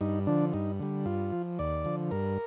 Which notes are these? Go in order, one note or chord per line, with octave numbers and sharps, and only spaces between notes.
G2 D#4
D3 F3 D4
G2 D#4
D3 G3
G2 F4
F3
D#2 D5
D3 F3
G2 A#4